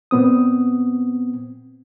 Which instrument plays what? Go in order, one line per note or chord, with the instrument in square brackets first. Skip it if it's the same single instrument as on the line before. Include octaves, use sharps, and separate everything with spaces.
[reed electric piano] A#2 B3 C4 D#6